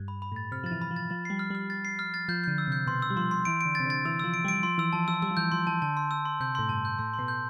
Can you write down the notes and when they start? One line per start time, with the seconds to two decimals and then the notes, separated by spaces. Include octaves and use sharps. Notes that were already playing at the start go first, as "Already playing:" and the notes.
Already playing: G2
0.08 B5
0.22 B5
0.32 A2 A6
0.51 C3 F6
0.64 F3
0.66 E3 A6
0.82 B5
0.91 F3
0.96 A6
1.10 F3 A6
1.25 G3 C7
1.39 F6
1.50 G3 F6
1.70 A6
1.85 C7
1.99 F6
2.14 A6
2.28 F3 G6
2.44 D3 G6
2.58 E6
2.68 C3 G6
2.87 B2 C6
3.02 E6
3.10 G3
3.16 F3 C6
3.31 C6
3.45 E3 D7
3.61 D3 D7
3.75 C3 A6
3.86 D3 A6
4.05 E3 E6
4.20 F3 E6
4.34 D7
4.45 G3 D7
4.63 F3 C6
4.78 E3 E6
4.93 F3 A5
5.08 F3 E6
5.22 G3 E6
5.31 F3
5.37 E3 G6
5.52 F3 C6
5.67 E3 A5
5.82 D3 A5
5.97 C6
6.11 E6
6.25 C6
6.40 C3 G6
6.55 A2 C6
6.69 G2 A5
6.85 G6
6.99 A2 C6
7.14 C6
7.19 B2
7.28 G6